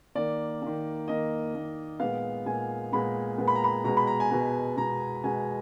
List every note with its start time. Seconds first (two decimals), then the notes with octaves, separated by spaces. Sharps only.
0.15 D#3 A#3 D5
0.62 D#3 A#3
1.08 D#3 A#3 D#5
1.54 D#3 A#3
2.00 A#2 G#3 B3 F5
2.46 A#2 G#3 B3 G#5
2.92 A#2 G#3 B3 B5
3.38 A#2 G#3 B3
3.48 B5
3.55 A#5
3.64 B5
3.84 B2 G#3 B3 A#5
3.97 B5
4.07 A#5
4.20 G#5
4.30 B2 G#3 B3 A#5
4.77 B2 G#3 B3 A#5
5.24 B2 G#3 B3 G#5